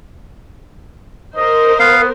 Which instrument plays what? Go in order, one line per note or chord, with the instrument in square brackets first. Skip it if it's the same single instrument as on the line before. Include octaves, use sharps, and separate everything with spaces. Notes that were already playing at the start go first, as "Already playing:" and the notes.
[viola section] A#4 C5 [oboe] D#5
[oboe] B3 [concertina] F5